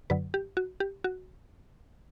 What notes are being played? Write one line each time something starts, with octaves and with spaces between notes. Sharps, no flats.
F#2 D3 F#3 B4
G4
F#4
G4
F#4